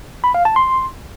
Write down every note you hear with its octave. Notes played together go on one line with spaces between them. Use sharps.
B5
F5
A5
C6